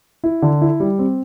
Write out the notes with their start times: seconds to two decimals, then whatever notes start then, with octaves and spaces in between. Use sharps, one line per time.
0.24 E4
0.42 D3
0.61 E4
0.80 G3
0.99 C4